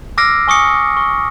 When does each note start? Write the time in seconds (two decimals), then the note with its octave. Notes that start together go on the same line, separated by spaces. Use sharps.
0.18 D6 E6 F6 A#6 C7 D7
0.48 G#5 C#6 D#6 C#7
0.97 C#6